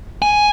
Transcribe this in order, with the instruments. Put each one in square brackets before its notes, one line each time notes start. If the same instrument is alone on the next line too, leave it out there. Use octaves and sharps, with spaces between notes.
[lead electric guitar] G#5